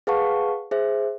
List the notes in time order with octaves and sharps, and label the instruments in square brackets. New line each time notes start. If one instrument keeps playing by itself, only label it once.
[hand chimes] G#4 B4 F5 F#5 A5 C#6
G#4 C5 E5